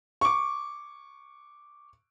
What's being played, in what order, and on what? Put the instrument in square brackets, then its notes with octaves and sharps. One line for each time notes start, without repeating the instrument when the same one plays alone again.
[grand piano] C#6 D6